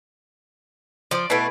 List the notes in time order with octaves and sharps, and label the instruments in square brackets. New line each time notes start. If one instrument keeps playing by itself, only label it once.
[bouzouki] F3 [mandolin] C5 D5
[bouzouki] B2 A3 [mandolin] E4 B4 D5